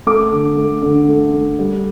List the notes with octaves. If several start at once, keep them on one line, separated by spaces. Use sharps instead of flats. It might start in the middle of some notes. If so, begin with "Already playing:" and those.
A3 D6
D3
A3
D3
A3
A3
G3